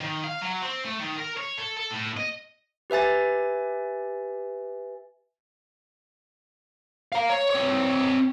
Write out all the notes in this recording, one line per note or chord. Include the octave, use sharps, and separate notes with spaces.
D#3
F5
F#3
C4
A3
D#3
A#4
C#5
A4
A4
A2
D#5
G4 B4 E5 G#5 A6
F5 A#5
C#5
C4 C#5